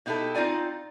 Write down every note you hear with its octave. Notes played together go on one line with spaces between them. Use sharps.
B2 D#4 E4 G4 A4
C4 D#4 F4 D5 G#5